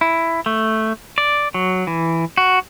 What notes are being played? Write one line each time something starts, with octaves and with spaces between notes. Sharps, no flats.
E4
A3
D5
F#3
E3
F#4